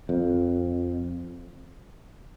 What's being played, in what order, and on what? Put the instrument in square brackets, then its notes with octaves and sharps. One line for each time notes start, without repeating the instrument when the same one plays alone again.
[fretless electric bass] F2